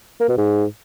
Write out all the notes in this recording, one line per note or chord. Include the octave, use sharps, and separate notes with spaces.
A#3
B2
G#2